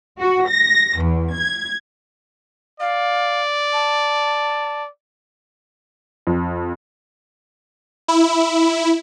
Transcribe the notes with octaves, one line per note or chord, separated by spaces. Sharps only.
F#4
A#6
E2
G#6
D5 F5
A5
F2
E4